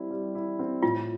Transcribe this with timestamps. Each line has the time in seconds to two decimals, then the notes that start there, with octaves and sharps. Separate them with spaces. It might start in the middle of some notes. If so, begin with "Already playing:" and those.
Already playing: G3 C4 E4
0.11 G3
0.35 E4
0.59 C4
0.83 A2 F4